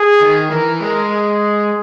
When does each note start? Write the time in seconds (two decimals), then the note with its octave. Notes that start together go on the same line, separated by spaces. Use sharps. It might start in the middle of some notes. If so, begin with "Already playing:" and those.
Already playing: G#4
0.21 D#3
0.50 E3 A#4
0.80 G#3 A#4
1.11 G#4